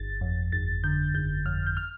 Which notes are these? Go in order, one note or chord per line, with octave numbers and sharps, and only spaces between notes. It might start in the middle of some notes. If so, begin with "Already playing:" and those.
Already playing: G1 A6
F2
G1 A6
D3 G6
G1 G6
F2 F6
G6
F6